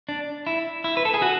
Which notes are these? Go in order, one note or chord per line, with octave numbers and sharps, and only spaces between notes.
D4
E4
E4
B4
A4
G#4
F#4